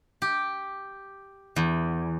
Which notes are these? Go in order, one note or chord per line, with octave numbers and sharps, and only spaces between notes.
G4
E2